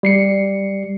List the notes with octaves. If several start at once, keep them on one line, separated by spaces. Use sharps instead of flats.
G3 C7 C#7